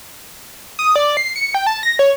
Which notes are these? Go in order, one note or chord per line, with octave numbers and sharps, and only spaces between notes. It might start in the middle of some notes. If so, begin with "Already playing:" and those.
D#6
D5
C7
C#7
G5
A5
A#6
C#5